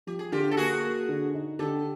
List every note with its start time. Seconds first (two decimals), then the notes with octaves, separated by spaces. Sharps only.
0.07 F3 G4
0.19 G#4
0.32 D3 F4 G4
0.51 A4
0.57 A#3 F#4 G#4
0.84 A#3
1.09 D3
1.34 D#4
1.59 D3 G4 A4